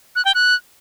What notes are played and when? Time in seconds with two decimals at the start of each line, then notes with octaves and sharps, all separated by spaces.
0.16 F#6
0.25 G5
0.35 F#6